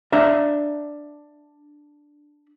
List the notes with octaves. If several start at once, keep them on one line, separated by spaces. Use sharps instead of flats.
D4 D5 E5 F5 A#5